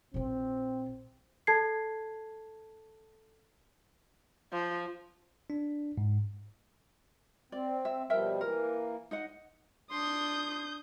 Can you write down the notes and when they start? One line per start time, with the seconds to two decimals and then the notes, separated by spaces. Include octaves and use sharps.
0.14 A#1 C4 F4
1.47 A4 A5 G#6 C7
4.53 F3
5.50 D4
5.97 G#2
7.52 C4 D5
7.85 E5
8.10 B2 F3 G3 A#4 E5 G5
8.41 E3 A#3 A#4
9.11 D#4 D#5 F#5
9.91 D4 C6 D#6 G6